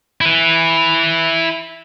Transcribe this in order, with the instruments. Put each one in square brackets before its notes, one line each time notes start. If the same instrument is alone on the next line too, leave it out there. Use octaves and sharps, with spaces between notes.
[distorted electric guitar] E4 B4